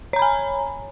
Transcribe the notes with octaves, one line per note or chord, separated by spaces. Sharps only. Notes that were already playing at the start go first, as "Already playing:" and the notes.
C#5 G#5 A#5 B5